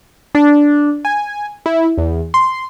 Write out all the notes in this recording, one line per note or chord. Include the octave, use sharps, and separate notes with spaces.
D4
G#5
E4
E2
C6